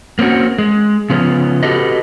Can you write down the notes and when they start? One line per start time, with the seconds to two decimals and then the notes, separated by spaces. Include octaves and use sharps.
0.19 A#3 C4 C#4 F#4
0.58 G#3
1.10 C#3 F3 B3 C#4
1.63 F#4 G4 A4 B4 D#5